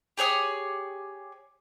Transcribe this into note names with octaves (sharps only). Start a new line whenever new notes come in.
G4 G#4 C#5 D#6